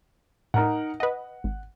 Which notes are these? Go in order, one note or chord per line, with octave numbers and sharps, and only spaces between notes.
A2 D#4 A#4 F#5
B4 D#5 F#5
G#1